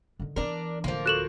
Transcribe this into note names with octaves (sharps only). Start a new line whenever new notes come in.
D3 D#3
E3 B3 D4 A#4
D1 D3 F3 A#3
F#4 A4 C#6 F#6 E7 F#7